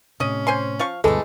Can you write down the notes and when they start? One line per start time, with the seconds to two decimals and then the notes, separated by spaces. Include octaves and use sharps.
0.20 A2 C3 C#4 D#5
0.47 C5 G#5 C6
0.79 F3 F5 C#6
1.04 D2 G2 B2 E3 G#3 A3 A4